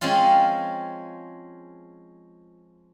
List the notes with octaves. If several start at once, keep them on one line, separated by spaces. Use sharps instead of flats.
F3 G#3 C4 C#4 F4